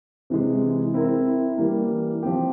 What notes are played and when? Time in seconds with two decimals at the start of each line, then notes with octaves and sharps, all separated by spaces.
0.30 C3 E3 G#3
0.94 C4 E4 A#4 E5
1.58 E3 G3 A#3
2.23 F3 C4 G4